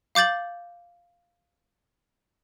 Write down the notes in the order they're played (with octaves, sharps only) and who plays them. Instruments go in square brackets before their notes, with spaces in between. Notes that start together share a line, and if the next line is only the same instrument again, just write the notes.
[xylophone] F5 D6 G6 A6 F#7